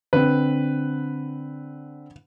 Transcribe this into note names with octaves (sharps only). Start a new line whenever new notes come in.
D3 C4 B4